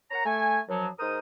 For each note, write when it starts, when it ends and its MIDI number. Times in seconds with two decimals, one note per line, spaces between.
0.11 0.24 70
0.11 0.24 73
0.11 0.24 78
0.11 0.24 82
0.25 0.60 57
0.25 0.60 80
0.69 0.87 42
0.69 0.87 53
0.69 0.87 54
0.99 1.19 44
0.99 1.19 70
0.99 1.19 72
0.99 1.19 87